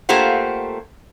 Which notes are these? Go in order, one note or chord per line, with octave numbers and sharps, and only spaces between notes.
A3 A#3 F4 G4 C5 F#5